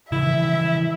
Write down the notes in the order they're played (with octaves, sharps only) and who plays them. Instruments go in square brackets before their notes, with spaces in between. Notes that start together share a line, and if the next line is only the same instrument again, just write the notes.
[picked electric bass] C#3 E3 F3 [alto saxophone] E4 [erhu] E5